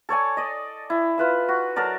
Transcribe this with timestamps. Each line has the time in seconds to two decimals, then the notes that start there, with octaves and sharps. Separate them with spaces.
0.09 A4 C#5 D5 G#5
0.37 D5 D#5
0.90 E4
1.18 F4 B4 E5
1.49 F#4
1.76 F#3 A4 A#4 D5